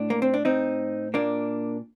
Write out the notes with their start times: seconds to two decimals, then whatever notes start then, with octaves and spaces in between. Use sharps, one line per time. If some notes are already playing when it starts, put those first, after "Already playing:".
Already playing: A2 D4
0.10 A#3
0.22 C4
0.34 D4
0.45 A2 C4 D#4
1.14 A#2 A#3 D4